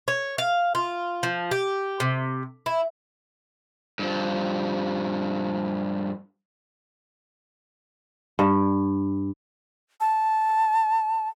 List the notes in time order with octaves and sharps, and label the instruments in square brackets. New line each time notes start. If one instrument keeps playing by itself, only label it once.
[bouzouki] C#5
F5
F4
F3
G4
C3
E4
[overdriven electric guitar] G2 F3
[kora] G2
[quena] A5